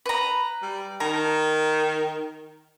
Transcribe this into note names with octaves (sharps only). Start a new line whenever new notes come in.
B4 A#5
G3
D#3 A#5